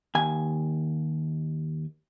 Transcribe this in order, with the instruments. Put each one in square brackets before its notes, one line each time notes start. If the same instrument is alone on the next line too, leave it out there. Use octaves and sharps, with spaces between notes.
[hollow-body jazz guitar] D#2 G#5